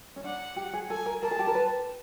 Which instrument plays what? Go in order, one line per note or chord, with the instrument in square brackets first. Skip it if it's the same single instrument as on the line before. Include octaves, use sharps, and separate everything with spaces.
[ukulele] C#4
[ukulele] D4 [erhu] F#5
[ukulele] G4
G#4
[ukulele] A4 [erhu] G#5
[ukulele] A#4
[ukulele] A#4 [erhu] A5
[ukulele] G#4
G4
A#4
B4